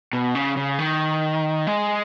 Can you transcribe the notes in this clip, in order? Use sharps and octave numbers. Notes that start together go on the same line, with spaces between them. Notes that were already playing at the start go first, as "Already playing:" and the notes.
B2
C#3
C#3
D#3
G#3